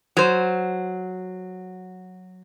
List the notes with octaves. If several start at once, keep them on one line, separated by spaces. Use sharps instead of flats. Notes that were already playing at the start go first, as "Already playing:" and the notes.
F#3 C5